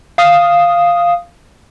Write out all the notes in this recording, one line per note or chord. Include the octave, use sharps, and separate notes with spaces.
F5 D#6